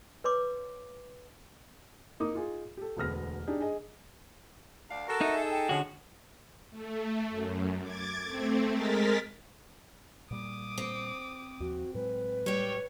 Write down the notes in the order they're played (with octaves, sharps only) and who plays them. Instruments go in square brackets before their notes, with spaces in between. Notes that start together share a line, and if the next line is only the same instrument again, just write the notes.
[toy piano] B4 C#5 C6 D6
[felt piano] A#3 D#4 D6 D#6
D#4 F4 G#4
G4 A4
E1 D2 B3 F6 A#6
D4 D#4 G4 G#4
G#4 D#5
[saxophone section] D2 D5 F5
[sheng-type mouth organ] F#4 A#4 [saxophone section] A4
[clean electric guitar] D#4 [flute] E5
[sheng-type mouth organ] G#4
[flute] G5
[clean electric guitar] D3 F#4 [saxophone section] F3 G#3 C#4
[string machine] A3
F#2
D6 G#6 A6
A3 C4
G#3 A#4 A6 B6
[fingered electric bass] A#2 G3 A#3 [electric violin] D6 D#6
[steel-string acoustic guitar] C4
[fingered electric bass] D#2 F3 [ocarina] F#4
[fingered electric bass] A2 F#3 G#3 [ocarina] B4
[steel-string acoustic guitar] G3 G5 [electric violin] C#5